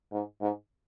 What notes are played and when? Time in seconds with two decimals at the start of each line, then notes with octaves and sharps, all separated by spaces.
0.12 G#2
0.41 G#2